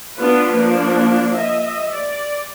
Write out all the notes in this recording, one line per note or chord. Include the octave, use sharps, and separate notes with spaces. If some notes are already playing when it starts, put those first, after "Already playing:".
B3 D4 F4 B4
F3 A#3 D4
D#5 E5
D5